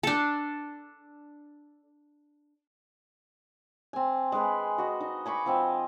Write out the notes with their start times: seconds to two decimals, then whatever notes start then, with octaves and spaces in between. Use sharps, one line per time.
0.03 D4 A4
3.93 C4 G#5
4.32 G#3 B4
4.78 F#4 D#5
5.01 D#4
5.26 G#5 B5 C#6 D6
5.46 F3 C4 D#5